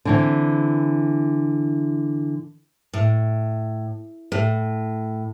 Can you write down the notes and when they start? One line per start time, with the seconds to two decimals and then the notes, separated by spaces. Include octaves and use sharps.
0.05 D3 E3 C4
2.93 A2
4.32 A2